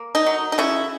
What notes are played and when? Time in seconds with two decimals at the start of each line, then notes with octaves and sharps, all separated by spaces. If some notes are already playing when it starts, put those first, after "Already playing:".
Already playing: A#3
0.15 D#4
0.26 F#3
0.52 D#4
0.58 C#3 C#4 E4